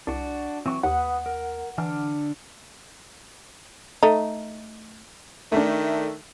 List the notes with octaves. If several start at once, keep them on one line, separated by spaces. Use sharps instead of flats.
C2 D4 F#4
E3 F#3 C4 C#6
D#2 B4 F#5 D#6
A#4
D3 E3 D4 F6
A3 D#4
D#3 A3 D4